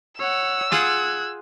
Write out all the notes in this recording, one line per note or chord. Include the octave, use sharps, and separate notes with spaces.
C#5 F#5 E6
F4 G#4 F#5 F#6 G#6